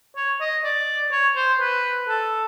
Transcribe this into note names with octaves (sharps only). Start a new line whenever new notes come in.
C#5
D#5
D5
C#5
C5
B4
A4